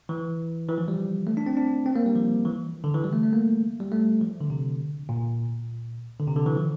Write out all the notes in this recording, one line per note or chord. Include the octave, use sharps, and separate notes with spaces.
E3
E3
F3
G3
A3
D4
C4
D4
C4
A#3
G3
F3
E3
D3
E3
G3
A3
A3
A#3
G3
A3
F3
D3
C3
A#2
D3
C3
D3
E3
F3